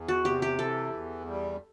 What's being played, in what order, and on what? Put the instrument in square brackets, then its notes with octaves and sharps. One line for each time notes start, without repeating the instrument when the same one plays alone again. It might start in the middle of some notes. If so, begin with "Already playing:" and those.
Already playing: [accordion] E2
[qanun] F#4
[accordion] C3 [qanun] G4
[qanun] G4
[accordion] E3 [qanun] A4
[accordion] E2
G3